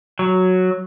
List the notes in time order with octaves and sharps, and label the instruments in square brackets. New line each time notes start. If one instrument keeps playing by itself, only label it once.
[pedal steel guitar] F#3